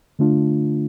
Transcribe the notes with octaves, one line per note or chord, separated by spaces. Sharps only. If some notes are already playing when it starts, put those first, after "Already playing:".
D3 A3 D4 F4